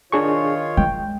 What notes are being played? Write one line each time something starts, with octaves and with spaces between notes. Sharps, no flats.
D#3 D4 F4 G#4 C#5 C#6
G#3 G5